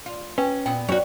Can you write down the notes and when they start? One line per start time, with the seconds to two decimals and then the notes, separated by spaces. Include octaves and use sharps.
0.06 F4
0.38 C#4 B4 G5
0.66 A#2 B3 G5
0.89 F#2 F#4 C#5